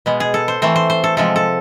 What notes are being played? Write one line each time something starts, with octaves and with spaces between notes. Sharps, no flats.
B2 G#3 B3
G#4
A4
C5
E3 A3 C4 C5
C5
C5
A4
C3 F3 G#3 A4
A4